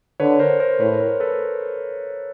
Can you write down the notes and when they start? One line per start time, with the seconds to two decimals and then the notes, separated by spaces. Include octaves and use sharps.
0.20 D3 B4 C#5
0.39 A#4 C5
0.60 A#4 C5
0.80 A2 B4 C#5
1.00 A#4 C5
1.20 A4 B4